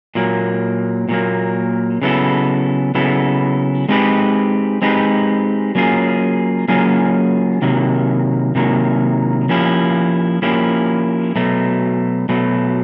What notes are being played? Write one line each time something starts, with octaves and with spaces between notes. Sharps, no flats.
A#2 F#3 A#3
A#2 F#3 A#3
C#3 F#3 B3 E4 A4
C#3 F#3 B3 E4 A4
G#3 C4 D#4 G4 B4
G#3 C4 D#4 G4 B4
F#3 A#3 C#4 F4 G#4
F#3 A#3 C#4 F4 G#4
C3 D#3 F#3 A#3
C3 D#3 F#3 A#3
F3 A#3 C#4 E4 G4
F3 A#3 C#4 E4 G4
B2 F#3 A3
B2 F#3 A3